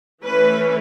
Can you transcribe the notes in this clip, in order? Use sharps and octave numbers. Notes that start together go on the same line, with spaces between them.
E3 A3 C#4 B4